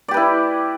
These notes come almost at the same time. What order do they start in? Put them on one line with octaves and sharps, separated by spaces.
D5 G4 B4 E4